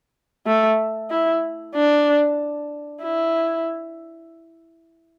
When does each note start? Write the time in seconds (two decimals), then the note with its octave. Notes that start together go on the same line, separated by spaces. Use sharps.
0.47 A3
1.10 E4
1.75 D4
3.03 E4